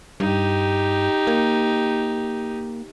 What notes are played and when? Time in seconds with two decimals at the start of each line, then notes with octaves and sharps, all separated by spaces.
0.20 G2 D#4 G4
1.27 A#3